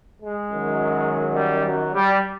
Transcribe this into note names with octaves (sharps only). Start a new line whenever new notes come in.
G#3
F#2 D#3 F#3
G3
F#3
G3